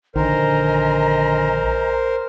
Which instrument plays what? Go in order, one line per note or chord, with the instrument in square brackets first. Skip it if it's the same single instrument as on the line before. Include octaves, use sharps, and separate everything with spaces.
[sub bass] A#1 [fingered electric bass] D3 D#3 [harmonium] A#4 C5 [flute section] D#5 G#5 A#5